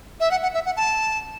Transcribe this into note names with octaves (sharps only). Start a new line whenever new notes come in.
E5
F#5
F#5
E5
F#5
A5